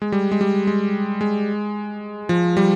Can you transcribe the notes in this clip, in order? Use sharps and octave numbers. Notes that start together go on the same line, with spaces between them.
G#3
G3
G#3
G3
G#3
G#3
F3
G3